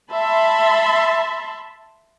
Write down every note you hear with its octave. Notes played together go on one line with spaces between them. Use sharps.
E5 A5 B5 C6